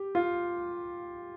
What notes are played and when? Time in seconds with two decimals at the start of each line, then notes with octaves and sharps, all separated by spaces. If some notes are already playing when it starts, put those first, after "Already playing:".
Already playing: G4
0.15 F4